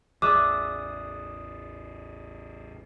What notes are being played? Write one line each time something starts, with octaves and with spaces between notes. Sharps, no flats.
A1 E2 G#4 D5 E5 D6 D#6 F#6